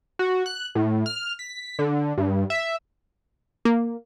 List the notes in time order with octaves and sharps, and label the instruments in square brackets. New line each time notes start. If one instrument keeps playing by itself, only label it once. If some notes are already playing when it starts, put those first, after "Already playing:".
[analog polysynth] F#4
F#6
A2
F6
B6
D3
G2
E5
[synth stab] A#3